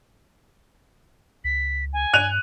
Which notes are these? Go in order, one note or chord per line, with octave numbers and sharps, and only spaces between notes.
C#2 B6
G#5
G2 F#6 D#7 F7